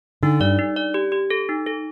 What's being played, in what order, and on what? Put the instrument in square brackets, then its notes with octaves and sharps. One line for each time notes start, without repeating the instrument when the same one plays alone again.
[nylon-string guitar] D3 [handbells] D#4
[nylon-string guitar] G2 [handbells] D5
[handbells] D#4
D5
G4
G4
A4
D#4
A4